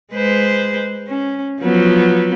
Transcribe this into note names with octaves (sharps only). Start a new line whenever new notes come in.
G#3 B4 C5
C#4
F3 F#3 B3